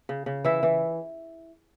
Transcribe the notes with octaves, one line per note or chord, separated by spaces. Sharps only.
C#3
C#3
E3 E4 E5
E3